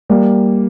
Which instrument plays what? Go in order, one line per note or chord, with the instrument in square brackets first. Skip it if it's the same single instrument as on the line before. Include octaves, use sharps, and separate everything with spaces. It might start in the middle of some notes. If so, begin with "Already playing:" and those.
[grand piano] G3 A#3